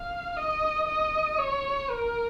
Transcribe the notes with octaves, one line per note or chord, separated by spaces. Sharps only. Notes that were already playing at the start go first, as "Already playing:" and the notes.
Already playing: F5
D#5
D#5
C#5
A#4